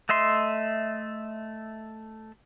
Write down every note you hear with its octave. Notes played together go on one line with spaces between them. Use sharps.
A3 D#5 E5 C6